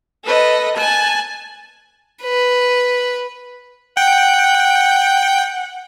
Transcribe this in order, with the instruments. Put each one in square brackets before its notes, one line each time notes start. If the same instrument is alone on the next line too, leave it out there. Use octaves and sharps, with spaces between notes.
[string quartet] A4 B4 D#5
G#5 A5 F#6
[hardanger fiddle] B4
[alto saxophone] F#5 [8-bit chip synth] G5